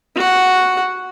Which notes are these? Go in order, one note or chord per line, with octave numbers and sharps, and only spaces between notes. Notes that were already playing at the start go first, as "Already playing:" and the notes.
F#4 F#5